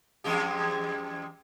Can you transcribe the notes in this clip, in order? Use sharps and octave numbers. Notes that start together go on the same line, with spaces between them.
E2 G#3 G4